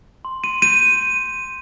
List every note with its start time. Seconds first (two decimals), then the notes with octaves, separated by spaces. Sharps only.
0.25 C6
0.44 C6 D#7
0.62 G6 D#7